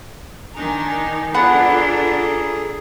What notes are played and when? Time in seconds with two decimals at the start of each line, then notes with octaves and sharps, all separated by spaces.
0.56 D#3 D4 D#4 G#5 A#5
1.34 B3 D4 F4 G#4 A4 F#5 A#5